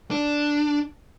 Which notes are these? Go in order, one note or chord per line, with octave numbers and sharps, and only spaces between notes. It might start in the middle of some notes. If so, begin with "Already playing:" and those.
D4